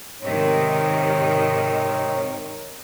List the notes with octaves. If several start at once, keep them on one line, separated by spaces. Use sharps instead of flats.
G#2 C3 D#3 C4 D#4 C#5